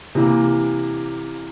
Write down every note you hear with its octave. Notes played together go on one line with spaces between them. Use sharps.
C3 E3 A#3